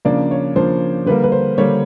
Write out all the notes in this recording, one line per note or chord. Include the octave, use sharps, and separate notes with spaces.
C#3 F3 A#3 D4 D5
C#5
C#3 F3 A#3 D4 C5
D3 G3 A#3 B4
B4
C5
D3 G3 A#3 C#5